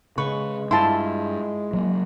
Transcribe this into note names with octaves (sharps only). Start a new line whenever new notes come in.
C#3 G#3 B4 C#6
G2 E4 F4 A5 C6
F#3 A#3